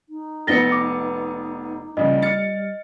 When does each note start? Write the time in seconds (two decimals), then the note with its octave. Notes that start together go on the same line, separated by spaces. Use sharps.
0.09 D#4
0.47 F1 B3 A6 A#6 C#7 G7
0.72 D6
1.97 A#1 C#3 G3 D#5
2.22 F6 A6 C#7